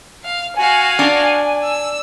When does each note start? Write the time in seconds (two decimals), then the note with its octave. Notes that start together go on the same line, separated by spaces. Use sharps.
0.24 F5
0.57 F#4 F5 G#5
0.99 D4
1.63 E6